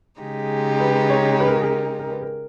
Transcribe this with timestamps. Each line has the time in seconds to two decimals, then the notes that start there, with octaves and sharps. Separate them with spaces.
0.21 C#3 G#3 D#4 G4
0.80 B4
1.09 C#5
1.40 B4
1.47 A#4
1.56 G#4
1.63 A#4
1.99 A#4
2.11 B4
2.22 A#4